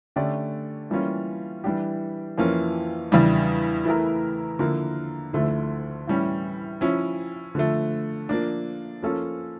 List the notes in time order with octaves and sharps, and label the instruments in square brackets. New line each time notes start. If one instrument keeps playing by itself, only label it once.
[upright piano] D3 A3 C#4 G4 D5
E3 G3 A#3 C#4 F4
E3 G3 D4 G4
F2 E3 A#3 C#4 F4
E2 C#3 E3 G3 D4
E3 A3 E4 A#4
D3 F3 A#3 E4 A#4
D2 D3 F3 A3 E4
A2 E3 G3 C#4
F3 C#4 E4
D3 F3 A3
F3 A#3 D4
F3 A#3 C#4 F4 A4